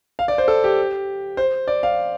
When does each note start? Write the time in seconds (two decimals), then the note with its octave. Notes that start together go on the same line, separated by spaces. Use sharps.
0.19 F5
0.28 D5
0.38 C5
0.48 A4
0.64 G4
1.37 C5
1.68 D5
1.83 F5